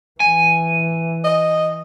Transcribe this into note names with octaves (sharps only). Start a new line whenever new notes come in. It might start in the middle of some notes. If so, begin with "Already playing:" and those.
E3 G#5
D#5